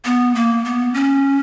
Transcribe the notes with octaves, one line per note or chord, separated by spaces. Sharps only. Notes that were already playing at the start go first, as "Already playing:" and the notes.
B3
A#3
B3
C#4